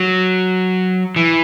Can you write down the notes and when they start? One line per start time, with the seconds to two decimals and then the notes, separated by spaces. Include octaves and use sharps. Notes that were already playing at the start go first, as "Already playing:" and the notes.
Already playing: F#3
1.16 E3